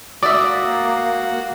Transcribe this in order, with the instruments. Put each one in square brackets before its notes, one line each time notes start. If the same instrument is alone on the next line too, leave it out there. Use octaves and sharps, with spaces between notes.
[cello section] A#3 [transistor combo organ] F#4 [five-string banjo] D5 E5 [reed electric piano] D6 D#6